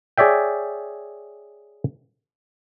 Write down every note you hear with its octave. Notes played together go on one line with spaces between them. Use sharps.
G#4 C#5 D5 E5 G5